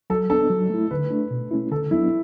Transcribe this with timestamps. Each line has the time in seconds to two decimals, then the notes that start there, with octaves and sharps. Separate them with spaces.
0.10 F#3 A4
0.30 B3 D4 A4
0.50 F#3
0.70 A3 E4
0.91 D3 B4
1.10 A3 D4
1.31 B2
1.51 A3 C#4 E4
1.71 D3 A4
1.91 F#3 B3 D4 E4